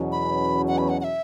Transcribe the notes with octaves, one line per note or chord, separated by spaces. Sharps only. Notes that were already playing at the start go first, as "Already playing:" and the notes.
Already playing: E2 B2 F#3 C#4
B5
F#5
B5
F#5
F#5
E5